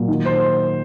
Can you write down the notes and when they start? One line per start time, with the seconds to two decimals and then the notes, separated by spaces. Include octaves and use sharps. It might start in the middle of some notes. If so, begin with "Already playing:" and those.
Already playing: A#2 F#3
0.08 D#3
0.25 C5